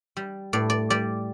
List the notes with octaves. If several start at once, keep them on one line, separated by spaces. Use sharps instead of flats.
G3
A2 D5
D5
G3 D5